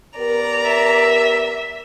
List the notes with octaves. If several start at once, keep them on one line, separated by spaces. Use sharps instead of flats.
B3 G4 A#4 D5 A#5
E5